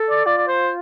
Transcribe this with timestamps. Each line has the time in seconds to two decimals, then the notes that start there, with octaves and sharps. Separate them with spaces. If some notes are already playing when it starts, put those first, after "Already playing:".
Already playing: A4
0.10 D5
0.26 F4 D5
0.38 D5
0.48 C5